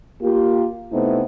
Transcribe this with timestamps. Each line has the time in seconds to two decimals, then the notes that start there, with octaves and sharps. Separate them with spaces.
0.22 A#3 F4 G4
0.92 C3 A3 B3 C4 D#4 E4